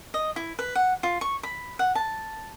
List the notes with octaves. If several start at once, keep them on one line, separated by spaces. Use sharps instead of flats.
D#5
E4
B4
F#5
F4
C#6
B5
F#5
A5